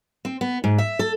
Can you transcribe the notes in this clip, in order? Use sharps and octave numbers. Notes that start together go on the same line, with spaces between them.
C4
B3
G#2
E5
A4